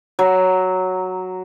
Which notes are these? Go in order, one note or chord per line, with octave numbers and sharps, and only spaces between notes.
F#3